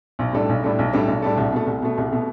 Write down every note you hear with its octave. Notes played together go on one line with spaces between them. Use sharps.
B1
A2 G3 D4 A4
B1
A2 G3 D4 A4
B1
A2 G3 D4 A4
B1
A2 G3 D4 A4
C2
B2 A3
C2
B2 A3
C2
B2 A3